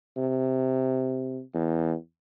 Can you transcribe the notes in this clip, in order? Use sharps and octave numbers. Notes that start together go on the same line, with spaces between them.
C3
E2